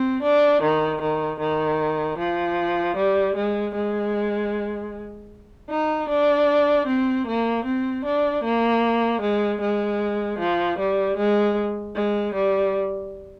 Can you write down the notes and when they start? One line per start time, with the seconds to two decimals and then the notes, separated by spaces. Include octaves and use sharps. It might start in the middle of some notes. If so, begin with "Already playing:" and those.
Already playing: C4
0.23 D4
0.62 D#3
1.02 D#3
1.40 D#3
2.18 F3
2.97 G3
3.36 G#3
3.75 G#3
5.70 D#4
6.09 D4
6.87 C4
7.27 A#3
7.65 C4
8.05 D4
8.44 A#3
9.21 G#3
9.61 G#3
10.39 F3
10.79 G3
11.18 G#3
11.95 G#3
12.35 G3